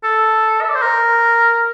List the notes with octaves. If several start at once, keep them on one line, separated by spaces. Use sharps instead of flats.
A4
E5
D5
C5
A#4